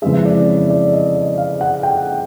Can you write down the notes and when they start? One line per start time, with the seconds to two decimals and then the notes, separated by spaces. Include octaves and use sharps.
0.02 F2 C#3 E3 G#3 E5
0.25 D5
0.48 C#5
0.70 D5
0.93 D#5
1.15 D#5
1.38 F5
1.61 F#5
1.83 G5